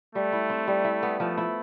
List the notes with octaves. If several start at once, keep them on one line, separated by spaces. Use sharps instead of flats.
G3 A3
E4
C4
G3
E4
B3
F3 A3
E4